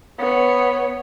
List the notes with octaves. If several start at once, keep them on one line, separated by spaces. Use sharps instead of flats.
B3 C#5